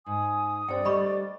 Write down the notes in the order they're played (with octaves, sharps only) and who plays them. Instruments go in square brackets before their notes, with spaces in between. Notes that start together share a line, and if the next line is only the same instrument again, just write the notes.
[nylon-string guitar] G#2 [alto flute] G#5 [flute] D#6
[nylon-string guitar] G2 C3 [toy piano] C5 G5 [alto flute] D5
[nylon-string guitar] D2 G3 A3 [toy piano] D#5 B5 C#6